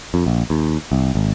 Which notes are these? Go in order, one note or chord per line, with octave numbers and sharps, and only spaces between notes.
F2
A#1
D#2
C2
G#1